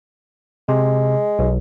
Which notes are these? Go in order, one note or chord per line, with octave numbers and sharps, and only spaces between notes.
C3 G#3
B1